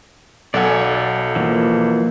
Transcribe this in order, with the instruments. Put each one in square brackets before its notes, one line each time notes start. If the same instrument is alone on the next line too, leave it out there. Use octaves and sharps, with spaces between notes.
[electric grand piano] B1 A4 F#5 [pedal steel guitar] D5 G#5
[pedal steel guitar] E3 F3 A#3